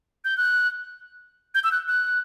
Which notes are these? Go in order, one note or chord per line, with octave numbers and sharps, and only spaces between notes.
G6
F#6
G6
E6
F#6
F#6